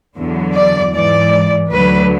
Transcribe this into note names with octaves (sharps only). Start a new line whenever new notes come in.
E2 D3 F#3
D5
G#2 E3 D5
D2 D3 F#3 B4